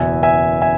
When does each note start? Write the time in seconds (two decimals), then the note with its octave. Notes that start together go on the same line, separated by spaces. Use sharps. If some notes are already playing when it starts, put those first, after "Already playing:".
Already playing: F#1 E2 B2 E5 G#5
0.23 E5 G#5
0.62 E5 G#5